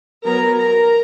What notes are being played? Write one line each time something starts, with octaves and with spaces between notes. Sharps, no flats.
F#3 B3 A#4 A#5
A#4 A#5